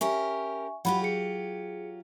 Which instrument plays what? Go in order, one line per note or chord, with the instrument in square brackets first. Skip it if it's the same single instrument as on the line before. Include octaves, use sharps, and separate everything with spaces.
[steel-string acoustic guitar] C#4 G4 A#4 [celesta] E5 G#5 C#6
[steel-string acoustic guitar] F#3 F4 G4 [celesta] F#5 B5
[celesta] G#4 C#7